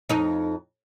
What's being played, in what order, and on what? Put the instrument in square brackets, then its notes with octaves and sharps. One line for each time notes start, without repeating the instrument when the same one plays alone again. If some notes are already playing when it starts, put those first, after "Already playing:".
[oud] F2 D#4